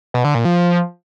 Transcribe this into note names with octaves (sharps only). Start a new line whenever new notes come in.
B2
D3
A#2
F3